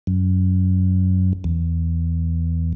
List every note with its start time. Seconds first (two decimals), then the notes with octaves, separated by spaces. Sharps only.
0.07 F#2
1.44 E2